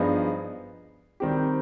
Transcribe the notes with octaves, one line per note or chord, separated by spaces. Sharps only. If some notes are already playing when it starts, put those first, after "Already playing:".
Already playing: G2 F3 B3 D#4 G#4
D#3 G3 C4 G4